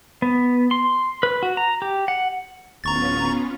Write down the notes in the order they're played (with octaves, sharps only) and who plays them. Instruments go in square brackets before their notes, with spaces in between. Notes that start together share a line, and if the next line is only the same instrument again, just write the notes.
[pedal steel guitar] B3
C6
B4
F#4
A#5
G4
F#5
[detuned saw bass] D1 [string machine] B3 C#4 F4 [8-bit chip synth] A#5 C#6 A6